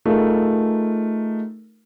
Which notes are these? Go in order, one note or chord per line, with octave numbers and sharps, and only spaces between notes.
A3 D#4 F4 G#4 A#4